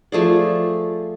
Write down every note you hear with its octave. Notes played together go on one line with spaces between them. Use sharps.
F3 A3 G#4 D5